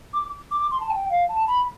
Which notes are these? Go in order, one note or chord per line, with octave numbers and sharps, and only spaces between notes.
D6
D6
C6
A5
G5
F5
A5
B5